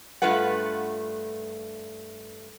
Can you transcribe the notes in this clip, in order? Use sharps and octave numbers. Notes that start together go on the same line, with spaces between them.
G2 A3 F4 B4 F#5